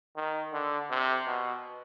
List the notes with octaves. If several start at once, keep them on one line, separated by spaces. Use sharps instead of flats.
D#3
D3
C3
B2